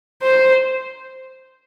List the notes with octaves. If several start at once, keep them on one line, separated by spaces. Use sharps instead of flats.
C5